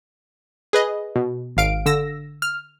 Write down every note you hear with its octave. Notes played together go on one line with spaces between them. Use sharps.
G#4 B4 D#5
B2
G#1 F5 D7
D3 E6 A#6
F6